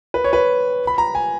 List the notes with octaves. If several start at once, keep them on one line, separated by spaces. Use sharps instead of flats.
B4
C#5
B4
B5
A#5
G#5